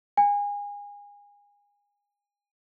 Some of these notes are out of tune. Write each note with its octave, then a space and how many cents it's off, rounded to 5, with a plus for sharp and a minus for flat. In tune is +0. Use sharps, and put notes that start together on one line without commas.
G#5 -30